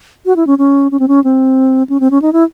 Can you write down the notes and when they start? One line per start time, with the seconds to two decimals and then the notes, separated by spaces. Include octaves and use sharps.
0.26 F#4
0.36 E4
0.47 C#4
0.58 C#4
0.92 C#4
1.00 C4
1.08 C#4
1.24 C4
1.89 C#4
2.00 C4
2.11 C#4
2.22 D#4
2.33 E4